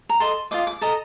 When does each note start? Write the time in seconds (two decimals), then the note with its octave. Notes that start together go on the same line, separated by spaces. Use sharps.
0.09 A#5
0.20 A4 D#5 C6
0.51 F4 C5 D#5 D6
0.67 D6
0.81 A4 D#5 A#5